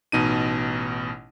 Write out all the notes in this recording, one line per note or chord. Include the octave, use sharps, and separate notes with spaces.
A1 B2 D#4 D#7